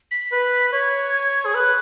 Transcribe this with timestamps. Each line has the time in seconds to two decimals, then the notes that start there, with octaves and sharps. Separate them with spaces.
0.11 B6
0.32 B4
0.73 C#5 G#6
1.45 G#4
1.55 B4 F#6